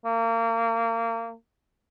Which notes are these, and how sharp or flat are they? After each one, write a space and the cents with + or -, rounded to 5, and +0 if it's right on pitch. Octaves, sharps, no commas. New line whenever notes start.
A#3 -30